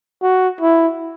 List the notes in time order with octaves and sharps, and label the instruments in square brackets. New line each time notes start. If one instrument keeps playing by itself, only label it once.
[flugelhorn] F#4
E4